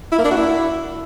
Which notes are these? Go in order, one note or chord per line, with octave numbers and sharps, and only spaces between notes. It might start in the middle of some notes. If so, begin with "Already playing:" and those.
E4
A#3
D4
F#4
E4